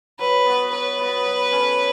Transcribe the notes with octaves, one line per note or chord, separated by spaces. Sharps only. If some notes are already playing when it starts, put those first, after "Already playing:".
F#3 B4
B3 F#4
F#3 B4
B3 F#4
F#3
C#4 A4